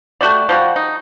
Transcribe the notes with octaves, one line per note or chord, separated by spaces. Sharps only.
A3 F#4 G4 D5
F3 G3 F#4
D#4